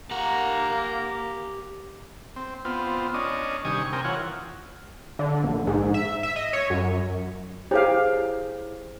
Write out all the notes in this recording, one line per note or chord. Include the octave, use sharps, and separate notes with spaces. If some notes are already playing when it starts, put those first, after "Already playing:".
A#3 G4 F#5 A#5
C4
B3 C4 F4
C#4 D4 D#5
C3 D#3 G3 G#5 C#6 D#6
C4 A#4 G5 G#5
E3 F4 C#5 F#5
D3
A#1
G#2
E5
E5
D#5
C#5
F#2
E4 G4 G#4 C5 C#5 F5